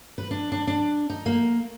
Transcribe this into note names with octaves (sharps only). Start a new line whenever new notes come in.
B4
D4
D4
D4
D#4
A#3